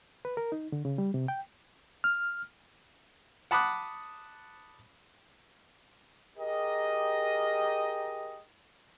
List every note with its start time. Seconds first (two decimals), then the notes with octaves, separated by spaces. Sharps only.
0.25 B4
0.37 A#4
0.52 D#4
0.72 D3
0.85 C#3
0.98 G3
1.14 C3
1.28 G5
2.04 F6
3.51 F#5 A5 B5 D6 D#6 F#6
6.37 G4 G#4 A#4 D#5